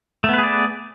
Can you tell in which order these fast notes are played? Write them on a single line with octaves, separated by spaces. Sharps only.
A3 B3 B4 G#4 D5